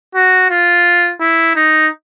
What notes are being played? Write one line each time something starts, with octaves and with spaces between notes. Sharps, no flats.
F#4
F4
E4
D#4